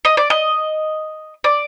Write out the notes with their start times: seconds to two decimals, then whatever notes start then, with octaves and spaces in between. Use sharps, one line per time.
0.05 D#5
0.17 D5
0.30 D#5
1.44 D5